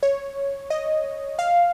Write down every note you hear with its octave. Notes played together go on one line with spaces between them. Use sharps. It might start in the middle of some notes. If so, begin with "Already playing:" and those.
C#5
D#5
F5